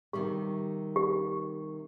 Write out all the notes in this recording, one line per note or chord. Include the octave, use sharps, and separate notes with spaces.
C3 D#3 G3 G4
G4